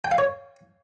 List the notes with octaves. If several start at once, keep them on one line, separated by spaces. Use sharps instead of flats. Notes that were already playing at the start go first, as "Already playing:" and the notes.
G5
F5
C#5